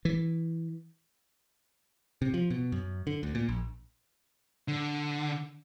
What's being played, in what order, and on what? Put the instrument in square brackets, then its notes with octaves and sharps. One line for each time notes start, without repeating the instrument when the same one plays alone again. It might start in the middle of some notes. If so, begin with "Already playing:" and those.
[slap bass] E3
[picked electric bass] C3
F3
B2
F#2
D3
D2
A#2
A#1
[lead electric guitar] D3